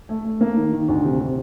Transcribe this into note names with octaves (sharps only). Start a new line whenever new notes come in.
A3
A3
A#3
D#3
D#3
D2
C3
C3